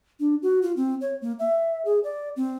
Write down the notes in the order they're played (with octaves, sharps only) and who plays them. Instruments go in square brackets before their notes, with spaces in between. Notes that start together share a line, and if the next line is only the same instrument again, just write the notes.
[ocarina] D4
F#4
F4
C4
C#5
A#3
E5
G#4
D5
C4